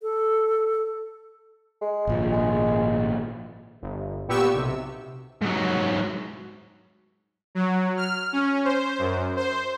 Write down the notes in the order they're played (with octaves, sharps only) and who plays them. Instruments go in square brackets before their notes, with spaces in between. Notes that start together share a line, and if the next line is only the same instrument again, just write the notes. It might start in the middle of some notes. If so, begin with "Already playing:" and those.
[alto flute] A4
[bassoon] G#3
[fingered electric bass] G#1 A#2 F3
[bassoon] G#3
[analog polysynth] G1
A#2 B3 G4 C#6 E6
B1 C3
[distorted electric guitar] G#2 F#3
[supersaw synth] F#3
F6
C#4
C5
F#2
C5